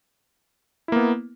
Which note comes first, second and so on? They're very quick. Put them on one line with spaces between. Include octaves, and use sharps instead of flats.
E4 A#3 B3